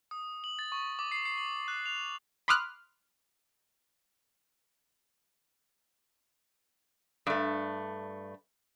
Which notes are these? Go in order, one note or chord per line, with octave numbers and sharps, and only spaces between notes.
D#6
F#7
A6
C#6
D6
C7
C7
F#7
F#6
F7
B5 C6 D6 D#6 F6 F#6
G2 A3